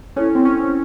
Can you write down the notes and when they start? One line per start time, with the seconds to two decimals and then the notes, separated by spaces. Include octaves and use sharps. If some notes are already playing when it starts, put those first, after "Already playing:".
0.16 C#4 E4 A4 C#5
0.35 C4
0.45 C#4